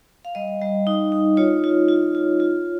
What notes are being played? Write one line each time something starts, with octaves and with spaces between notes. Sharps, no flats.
F5
G3 D#5
G3
D#4
D#4
F4 C#5
F4
F4
F4
F4